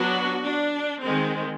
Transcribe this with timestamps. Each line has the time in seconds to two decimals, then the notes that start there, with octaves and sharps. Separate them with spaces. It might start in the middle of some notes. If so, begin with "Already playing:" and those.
Already playing: F#3 B3 D4 F#4
0.43 D4
1.00 D#3 G#3 C4